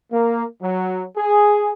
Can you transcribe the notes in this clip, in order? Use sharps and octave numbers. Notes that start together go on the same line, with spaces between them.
A#3
F#3
G#4